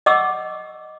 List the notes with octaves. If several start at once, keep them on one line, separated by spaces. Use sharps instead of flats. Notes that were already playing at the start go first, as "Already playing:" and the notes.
D#5 F#5 C#6 D6 E6